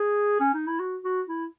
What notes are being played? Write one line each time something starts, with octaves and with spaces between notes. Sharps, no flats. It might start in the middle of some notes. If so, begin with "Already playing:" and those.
Already playing: G#4
C#4
D#4
E4
F#4
F#4
E4